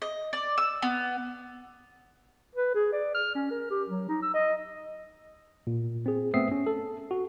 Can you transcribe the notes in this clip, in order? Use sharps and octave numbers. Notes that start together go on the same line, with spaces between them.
D#5
D5
E6
B3
B4
G#4
D5
F6
C#4
A#4
G4
F#3
D#4
E6
D#5
A#2
C4 G#4
A3 B3 C4 E5 D#6 C7
C#4
A4
F#4